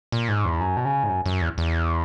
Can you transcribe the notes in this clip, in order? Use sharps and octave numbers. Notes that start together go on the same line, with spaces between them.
A#2
G#2
E2
F#2
B2
C#3
G#2
F#2
F#2
E2
E2